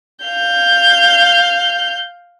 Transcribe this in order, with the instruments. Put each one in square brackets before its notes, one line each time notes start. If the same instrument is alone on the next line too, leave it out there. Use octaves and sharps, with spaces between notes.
[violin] F5 G6